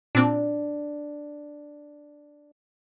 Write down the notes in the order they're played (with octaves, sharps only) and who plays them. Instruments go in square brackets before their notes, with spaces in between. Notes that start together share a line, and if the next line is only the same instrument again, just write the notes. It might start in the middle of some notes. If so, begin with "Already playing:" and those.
[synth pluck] A#2 C4 D7 [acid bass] D4